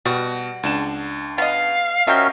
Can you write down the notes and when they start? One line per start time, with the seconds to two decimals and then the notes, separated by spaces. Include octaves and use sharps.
0.05 B2 G3 F#4
0.63 C#2 D4 E7
1.38 B3 D#5 F5
2.07 F3 C#4 F#4 A#4 D#5 E5 G5